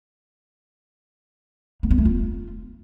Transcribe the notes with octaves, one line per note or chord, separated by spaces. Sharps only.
A#3
B3
A3
F4